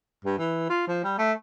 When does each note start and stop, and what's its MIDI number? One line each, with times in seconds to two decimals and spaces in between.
0.25 0.37 43
0.39 0.69 52
0.70 0.85 65
0.88 1.02 53
1.04 1.16 55
1.18 1.33 57